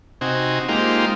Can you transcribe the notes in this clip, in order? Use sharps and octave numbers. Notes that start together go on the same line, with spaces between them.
C3 C4 D#4 F#4 G#5
G#3 A#3 C4 D#4 F4 G4